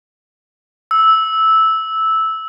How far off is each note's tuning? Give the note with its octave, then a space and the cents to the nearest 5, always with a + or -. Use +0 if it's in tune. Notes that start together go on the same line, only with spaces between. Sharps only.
E6 -10